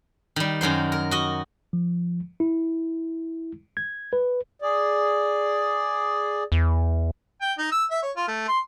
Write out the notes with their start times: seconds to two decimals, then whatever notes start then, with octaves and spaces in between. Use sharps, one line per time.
0.36 D#3 G3
0.61 F#2 D#3 F#3 C5
0.92 A#4
1.11 F#4 D#5
1.73 F3
2.40 E4
3.77 G#6
4.13 B4
4.62 G#4 D5
6.52 E2
7.41 G5
7.59 D#4
7.72 E6
7.91 E5
8.03 C#5
8.17 F4
8.28 A3
8.48 C6